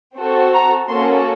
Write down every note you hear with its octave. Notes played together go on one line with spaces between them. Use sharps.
C4 F#4 A4
A#5
A#3 C#4 F#4 A4 C6